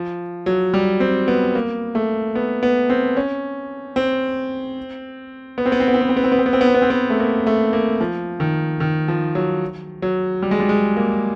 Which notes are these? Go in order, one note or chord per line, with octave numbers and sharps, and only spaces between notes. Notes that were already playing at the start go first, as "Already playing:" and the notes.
Already playing: F3
F#3
G3
C4
B3
A#3
A3
B3
B3
C4
C#4
C4
B3
C4
B3
C4
B3
C4
B3
C4
B3
C4
B3
C4
B3
C4
B3
C4
B3
C4
B3
A3
A#3
A3
A#3
F3
D#3
D#3
F3
F#3
F#3
G3
G#3
G3
G#3
A#3